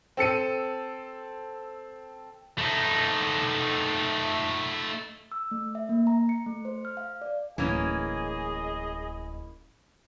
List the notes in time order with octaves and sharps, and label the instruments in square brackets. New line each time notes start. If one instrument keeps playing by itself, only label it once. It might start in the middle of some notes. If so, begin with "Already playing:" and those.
[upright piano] C4 A4 C#7 D#7
[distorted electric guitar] A3 D#4
[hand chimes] E6
A3
E5
A#3
A#5
C#7
A3
C5
F6
F5
D5
[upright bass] D1 [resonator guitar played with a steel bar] E3 A#3 C#4 [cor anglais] G#4 [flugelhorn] D#5